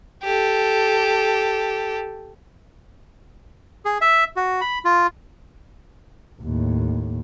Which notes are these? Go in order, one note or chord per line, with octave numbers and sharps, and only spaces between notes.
G4 A4
G#4
E5
F#4
B5
F4
D#2 A2